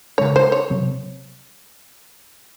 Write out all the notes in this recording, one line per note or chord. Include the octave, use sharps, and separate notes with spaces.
C#3 G#3 C#4 C#5
C5
C#5
C3 F#3 C4